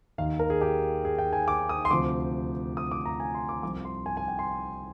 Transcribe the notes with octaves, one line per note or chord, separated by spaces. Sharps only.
D#2 D#3 F5
A#4
G#4
G4
G#4
G5
G#5
D6
D#6
C6
D2 C3 F3 D6
D#6
D6
A#5
G#5
C6
D6
C2 C3 F3 D6
C6
G#5
G#5
G5
C6